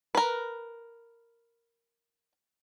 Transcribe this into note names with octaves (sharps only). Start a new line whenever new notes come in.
A#4 B4